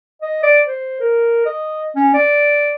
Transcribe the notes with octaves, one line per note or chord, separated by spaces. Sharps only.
D#5
D5
C5
A#4
D#5
C#4
D5